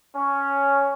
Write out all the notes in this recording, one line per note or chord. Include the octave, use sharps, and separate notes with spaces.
C#4